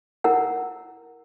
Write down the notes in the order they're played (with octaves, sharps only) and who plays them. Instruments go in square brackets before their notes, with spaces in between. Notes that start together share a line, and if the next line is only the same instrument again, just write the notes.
[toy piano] E4 A#4 F#5